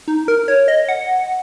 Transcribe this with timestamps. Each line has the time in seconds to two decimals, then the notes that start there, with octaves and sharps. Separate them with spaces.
0.08 D#4
0.28 A#4
0.48 C#5
0.68 D#5
0.88 F#5